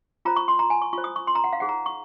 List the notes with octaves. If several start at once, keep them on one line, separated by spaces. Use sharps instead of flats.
F4 C5 A#5
C#6
C6
A#5
G#5
C#6
F4 C5 C#6
D#6
C#6
C6
A#5
F#5
F5
D#4 G#4 C5 F#5
A#5
C#6